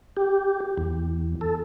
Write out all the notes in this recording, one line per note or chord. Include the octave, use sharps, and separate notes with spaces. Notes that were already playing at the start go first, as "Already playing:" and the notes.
G4
E2
A4